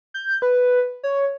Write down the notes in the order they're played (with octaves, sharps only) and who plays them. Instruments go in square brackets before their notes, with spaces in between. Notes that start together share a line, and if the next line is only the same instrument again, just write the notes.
[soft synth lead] G6
B4
C#5